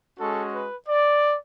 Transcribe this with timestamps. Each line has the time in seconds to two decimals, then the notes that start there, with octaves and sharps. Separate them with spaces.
0.18 G#3 C#4 F#4 A4
0.52 B4
0.87 D5